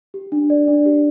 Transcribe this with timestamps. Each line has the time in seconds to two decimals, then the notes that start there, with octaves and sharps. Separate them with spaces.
0.14 G4
0.32 D4
0.50 D5
0.68 D4
0.86 G4